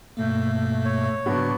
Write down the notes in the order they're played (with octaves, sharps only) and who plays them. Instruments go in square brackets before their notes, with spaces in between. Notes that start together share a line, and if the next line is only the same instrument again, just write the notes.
[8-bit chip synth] G2 B2 A#3 [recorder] A3
[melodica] C#5
[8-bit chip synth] G#2 C#3 [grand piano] F#3 B3 F#4 [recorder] D4